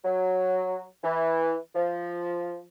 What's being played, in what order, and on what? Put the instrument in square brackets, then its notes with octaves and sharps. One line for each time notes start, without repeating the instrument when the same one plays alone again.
[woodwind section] F#3
E3
F3